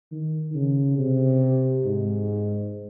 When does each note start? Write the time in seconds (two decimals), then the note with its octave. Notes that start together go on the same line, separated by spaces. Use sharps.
0.12 D#3
0.55 C#3
0.98 C3
1.85 G#2